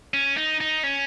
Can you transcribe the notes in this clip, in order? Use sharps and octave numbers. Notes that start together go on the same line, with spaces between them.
C#4
D#4
D#4
C#4